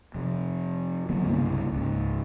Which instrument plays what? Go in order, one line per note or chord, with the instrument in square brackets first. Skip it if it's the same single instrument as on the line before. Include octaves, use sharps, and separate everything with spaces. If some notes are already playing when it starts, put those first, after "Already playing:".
[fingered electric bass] F2 C3
D3 F#3 A#3 B3
C2 G2 C#3 A#3
C#2 G#2